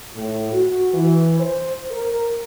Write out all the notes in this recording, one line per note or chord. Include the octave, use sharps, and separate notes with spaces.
A2
F#4
E3
C5
A#4